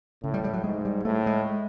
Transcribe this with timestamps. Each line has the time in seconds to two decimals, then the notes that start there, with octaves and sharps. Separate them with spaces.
0.23 A2 C#3
0.34 G3
0.44 G3
0.54 F#3
0.64 G#2 G#3
0.85 G3
1.05 A2 A3
1.26 G#3